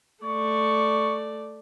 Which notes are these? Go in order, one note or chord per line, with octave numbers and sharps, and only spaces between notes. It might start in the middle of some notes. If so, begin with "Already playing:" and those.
A3 D5 C#6